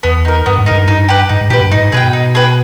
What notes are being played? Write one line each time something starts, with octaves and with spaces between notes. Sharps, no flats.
E2 B3
D#4 A#4
G2 B3
G#2
G2 D#4 A#4
D#4
G4 B4
G#2 D#4
G#2
A#2 G4 B4
G2
G#2 D#4
B2 G#4 B4 G5
D#4
G#4 B4 G5